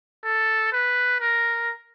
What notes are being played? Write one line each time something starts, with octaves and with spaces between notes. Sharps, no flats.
A4
B4
A#4